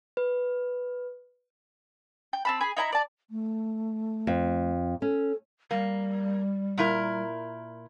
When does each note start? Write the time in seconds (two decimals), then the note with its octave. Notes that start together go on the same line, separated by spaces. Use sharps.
0.17 B4
2.33 G5
2.45 C4 A5 B5
2.61 G#4 G#5 B5
2.77 D#4 E4 G#5 A#5
2.92 D5 A5
3.30 A3
4.27 F2
5.02 C#4 A4
5.71 G3 A#3
6.78 A#2 E4 A#4